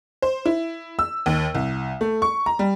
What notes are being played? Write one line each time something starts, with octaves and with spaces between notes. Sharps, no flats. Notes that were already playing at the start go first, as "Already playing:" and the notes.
C5
E4
E6
D#2
C2
A3
C#6
A#5
G3